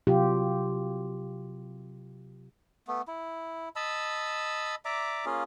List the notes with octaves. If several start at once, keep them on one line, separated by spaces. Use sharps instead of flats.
C3 F#3 F4 G4
A3 B3
E4
D#5 A5 B5 E6
D5 E5 A#5 D6
A#3 C#4 F4 G#4